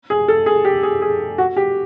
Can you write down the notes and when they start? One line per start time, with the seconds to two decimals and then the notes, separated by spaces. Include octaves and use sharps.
0.10 G#4
0.28 A4
0.46 G#4
0.65 G4
0.83 G#4
1.02 G#4
1.38 F#4
1.57 G4